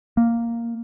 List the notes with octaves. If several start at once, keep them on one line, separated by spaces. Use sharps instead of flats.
A#3